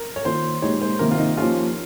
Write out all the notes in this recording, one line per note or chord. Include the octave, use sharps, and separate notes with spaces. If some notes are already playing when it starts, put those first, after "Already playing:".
Already playing: A#4
C#5
D#3 A#3 F4 C5
A#2 G#3 D#4 G4 C#5
C5
C3 D#3 A#3 A#4
F4
D#4
F3 A#3 C#4 F4 G4